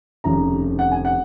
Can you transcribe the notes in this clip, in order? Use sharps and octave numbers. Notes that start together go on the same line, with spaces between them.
F1 D#2 C#3 F3 A#5
F#5
G#5
F#5